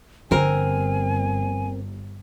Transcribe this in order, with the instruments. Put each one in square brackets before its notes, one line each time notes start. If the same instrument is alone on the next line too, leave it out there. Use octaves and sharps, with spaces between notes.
[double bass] G1 [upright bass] D3 F3 [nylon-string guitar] C4 A#4 [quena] G#5